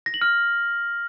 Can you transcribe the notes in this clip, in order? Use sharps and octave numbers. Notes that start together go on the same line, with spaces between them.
A#6
F#7
F6